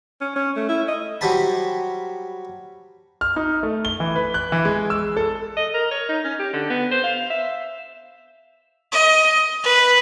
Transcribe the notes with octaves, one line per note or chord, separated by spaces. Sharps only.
C#4
C#4
A3
E4
D#5
F#3 G3 C5 A5 B5
F6
D#4
A3
G7
E3
B4
F#6
E3
G#3
E6
A4
D#5
A#4
C#5
D#4
C#4
G4
D3
B3
C5
F5
E5
D#5
B4